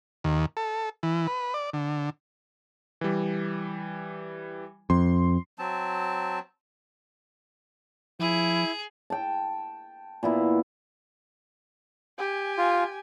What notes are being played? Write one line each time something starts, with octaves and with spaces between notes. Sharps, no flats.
D#2
A4
E3
B4
D5
D3
E3 G3
F2 C6
F#3 C4 A5
F3 E4 G#4
G5 A5
A#2 B3 E4
G4 G#5
F4